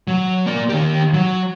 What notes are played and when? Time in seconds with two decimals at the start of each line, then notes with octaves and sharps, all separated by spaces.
0.08 F#3
0.46 A#3 D5
0.69 D#3 G4
1.14 F#3